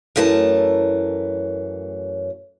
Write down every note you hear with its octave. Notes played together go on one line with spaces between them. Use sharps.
F#2 E3 A3 A#4 A5